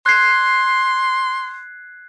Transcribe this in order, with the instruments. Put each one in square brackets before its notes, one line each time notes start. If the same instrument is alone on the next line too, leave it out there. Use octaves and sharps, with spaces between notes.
[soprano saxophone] C6 [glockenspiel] F#6 G#6 C7